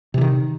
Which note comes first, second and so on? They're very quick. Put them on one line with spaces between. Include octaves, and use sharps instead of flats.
C3 E3 D#3